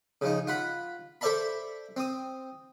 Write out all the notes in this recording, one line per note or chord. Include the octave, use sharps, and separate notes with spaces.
C#3 F3 D#4
F4 F#5 B5
A4 C5 D5 E5 A5 B5
C4 D#6